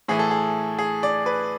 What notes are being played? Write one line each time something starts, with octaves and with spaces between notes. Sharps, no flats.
A2 E3 G#4
A4
G#4
G#4
D5
B4